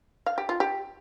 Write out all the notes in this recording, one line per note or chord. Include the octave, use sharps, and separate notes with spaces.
F5
G4
F4
G4